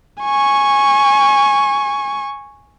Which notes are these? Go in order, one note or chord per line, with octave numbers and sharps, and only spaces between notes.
G#5 C#6